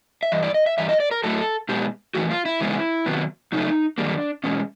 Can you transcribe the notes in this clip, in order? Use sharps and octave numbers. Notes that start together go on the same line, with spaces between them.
E5
G2 E3 D#5
D5
D#5
E5
G2 E3 E5
D#5
D5
A#4
A2 F#3 A3 A4
B2 G#3 B3 G4
F2 C#3 E3 A3 F#4
F4
E4
E2 C#3 G#3 B3
C3 D#3 F#3 B3
F#2 C#3 A3 D#4
F#2 D#3 G3 A#3 D4
E2 B2 G#3 C#4